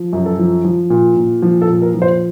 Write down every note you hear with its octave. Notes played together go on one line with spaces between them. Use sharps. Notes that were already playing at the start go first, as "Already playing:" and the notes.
Already playing: F3
F#2
A4
F3
F3
A#2
A#2
F3
A4
A#2
A#4
F3
C5